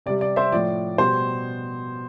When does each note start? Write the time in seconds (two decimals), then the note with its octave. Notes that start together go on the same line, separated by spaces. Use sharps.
0.06 C3 D5
0.09 G3
0.21 D5
0.36 C5 E5
0.52 A2 F3 D5
0.98 B2 G3 C5